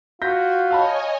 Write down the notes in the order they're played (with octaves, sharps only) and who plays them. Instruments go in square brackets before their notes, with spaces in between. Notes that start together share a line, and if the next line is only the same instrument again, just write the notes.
[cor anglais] F4 [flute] F#4 [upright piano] G6 A#6 B6
[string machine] C#5 D#5 G#5 [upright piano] F5 A5 B5